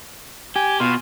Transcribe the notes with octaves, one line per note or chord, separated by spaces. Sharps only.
G4 G#5
B2 F4